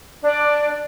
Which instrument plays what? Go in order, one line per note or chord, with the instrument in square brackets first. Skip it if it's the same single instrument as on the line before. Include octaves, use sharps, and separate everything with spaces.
[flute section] D4 D5